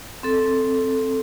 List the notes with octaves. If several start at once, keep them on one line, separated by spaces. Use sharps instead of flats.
C4 A4